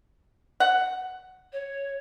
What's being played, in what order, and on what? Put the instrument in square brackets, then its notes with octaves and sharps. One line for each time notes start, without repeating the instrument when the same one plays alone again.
[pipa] F#5
[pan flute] C#5